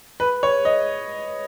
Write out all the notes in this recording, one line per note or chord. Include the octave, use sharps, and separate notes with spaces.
B4
C#5
D#5